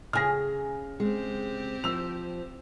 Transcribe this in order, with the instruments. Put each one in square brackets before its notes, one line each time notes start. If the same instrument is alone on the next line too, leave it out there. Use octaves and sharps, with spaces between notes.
[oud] C#3 G#4 [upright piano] F6 A#6
[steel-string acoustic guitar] G#3 [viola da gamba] C4 G4 C5
[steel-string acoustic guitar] F3 [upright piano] E6 F7